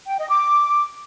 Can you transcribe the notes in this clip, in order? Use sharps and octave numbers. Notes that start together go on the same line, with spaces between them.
G5
D#5
D6